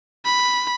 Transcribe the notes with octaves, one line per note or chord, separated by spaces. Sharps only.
B5